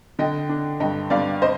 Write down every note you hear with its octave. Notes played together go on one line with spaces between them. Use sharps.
D3 D#5 G5
D4
G2 D#5 G5
G2 D5 F5
C5 D#5